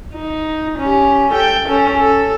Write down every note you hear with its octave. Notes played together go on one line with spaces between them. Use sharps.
D#4
C#4 G4
A4 G5
C#4 A4
A4